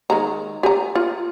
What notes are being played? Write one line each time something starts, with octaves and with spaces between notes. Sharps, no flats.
D#3 G#3 A#5
G4 G#5 A#5
F4